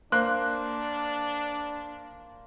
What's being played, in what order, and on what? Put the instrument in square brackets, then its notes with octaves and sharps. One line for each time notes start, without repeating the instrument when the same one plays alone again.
[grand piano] A#3 C5 F#6 [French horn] D4